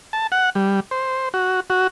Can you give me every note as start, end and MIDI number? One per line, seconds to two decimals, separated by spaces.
0.13 0.27 81
0.32 0.50 78
0.55 0.80 55
0.91 1.29 72
1.34 1.60 66
1.70 1.87 66